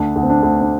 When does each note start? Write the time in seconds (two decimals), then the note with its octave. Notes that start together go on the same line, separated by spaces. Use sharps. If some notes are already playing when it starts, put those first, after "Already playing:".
Already playing: D2 D4
0.16 D2
0.23 C4
0.30 D4
0.43 D2
0.61 D4